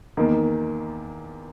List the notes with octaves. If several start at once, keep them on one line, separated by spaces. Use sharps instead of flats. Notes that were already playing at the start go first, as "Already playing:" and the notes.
E2 D#3 A#3